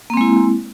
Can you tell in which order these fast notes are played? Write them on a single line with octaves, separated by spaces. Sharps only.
A#3 C4 G#3 E4